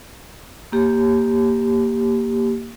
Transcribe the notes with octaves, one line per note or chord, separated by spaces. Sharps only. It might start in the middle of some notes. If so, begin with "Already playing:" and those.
A#3 G4